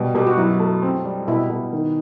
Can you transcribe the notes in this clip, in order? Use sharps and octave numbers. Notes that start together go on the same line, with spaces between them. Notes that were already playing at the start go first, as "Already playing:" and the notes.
Already playing: B2 G3
B2 G4
F#4
F#2 E4
A3
C4
G3
B2 E4
B2
D#3